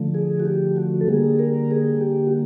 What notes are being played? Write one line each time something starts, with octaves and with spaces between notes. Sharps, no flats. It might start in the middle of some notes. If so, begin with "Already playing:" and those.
Already playing: D3 F3 A3
G#4
F#4
G4
F#4
A4
D3 G3 A#3 G#4
A#4
G#4
G4
F#4